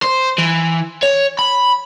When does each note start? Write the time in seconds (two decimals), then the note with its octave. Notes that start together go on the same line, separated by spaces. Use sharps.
0.02 C5
0.39 E3
1.03 C#5
1.39 B5